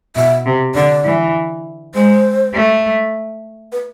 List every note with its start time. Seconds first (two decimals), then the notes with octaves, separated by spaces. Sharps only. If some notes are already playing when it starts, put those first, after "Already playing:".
0.16 B2 E5
0.46 C3
0.75 D3 D5
1.04 E3
1.94 G#3 C5
2.54 A3
3.72 B4